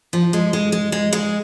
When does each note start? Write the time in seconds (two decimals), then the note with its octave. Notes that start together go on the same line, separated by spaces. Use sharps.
0.13 F3
0.33 G#3
0.53 G#3
0.72 G#3
0.92 G#3
1.13 G#3